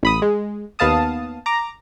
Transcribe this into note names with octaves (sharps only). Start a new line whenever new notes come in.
A1 B5 D#6
G#3
D#2 B3 F5 A5 D#6
A#5 D6